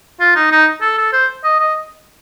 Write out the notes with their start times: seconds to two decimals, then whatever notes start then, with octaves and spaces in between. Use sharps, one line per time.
0.20 F4
0.36 D#4
0.51 D#4
0.81 A4
0.98 A4
1.13 C5
1.44 D#5
1.60 D#5